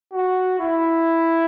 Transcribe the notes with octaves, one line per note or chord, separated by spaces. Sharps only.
F#4
E4